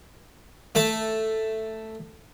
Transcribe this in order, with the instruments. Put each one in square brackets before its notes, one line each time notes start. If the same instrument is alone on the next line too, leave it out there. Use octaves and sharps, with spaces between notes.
[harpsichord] A3 E5 A5